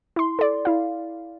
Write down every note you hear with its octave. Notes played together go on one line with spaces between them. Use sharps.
E4 C6
A4 D5
E4 F5